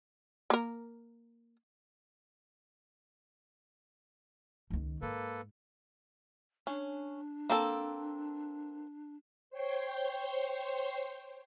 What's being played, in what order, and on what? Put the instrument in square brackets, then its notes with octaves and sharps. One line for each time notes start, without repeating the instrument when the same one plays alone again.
[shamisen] A#3 A#4
[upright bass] C#2 D#3
[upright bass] G#2 [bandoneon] A#3 A4 B4
[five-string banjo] C#4 [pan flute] D4
[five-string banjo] A#3 C4 A4
[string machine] C5 C#5 G5 C6